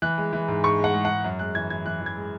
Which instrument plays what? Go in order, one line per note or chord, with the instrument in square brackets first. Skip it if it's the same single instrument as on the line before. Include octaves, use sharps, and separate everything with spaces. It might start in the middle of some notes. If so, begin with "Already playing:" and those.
[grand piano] E3 F#6
G#3
E3
G#2
G#2 C#6
G#3
F#5
G#3
G#2 F#5
F#2
G#3 F#6
E3 G#6
E3 G#6
E3 F#6
E3
G#6
G#3